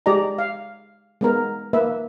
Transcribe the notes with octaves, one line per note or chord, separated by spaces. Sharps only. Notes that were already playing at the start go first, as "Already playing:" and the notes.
G#3 G4 D5 D#5 A#5
F5
G#3 B3 A#4
A#3 B4 E5